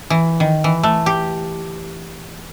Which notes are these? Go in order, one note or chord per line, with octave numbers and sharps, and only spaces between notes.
E3
D#3
E3
A3
G4